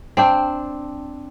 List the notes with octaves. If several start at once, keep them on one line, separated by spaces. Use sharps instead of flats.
C4 D4 G5